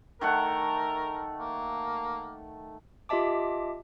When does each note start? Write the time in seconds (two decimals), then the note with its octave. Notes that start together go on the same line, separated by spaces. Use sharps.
0.21 D#3 A3 A#4 F#5
1.40 A#3
3.09 F4 G4 D#5 E5 A5 D6